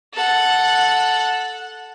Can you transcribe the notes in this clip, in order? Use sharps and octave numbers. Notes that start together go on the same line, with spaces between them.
A4 F#5